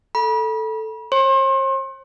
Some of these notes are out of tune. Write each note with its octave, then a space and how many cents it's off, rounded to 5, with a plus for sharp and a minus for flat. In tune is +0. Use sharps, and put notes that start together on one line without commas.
A4 +0 B5 -40
C5 +45 C6 +35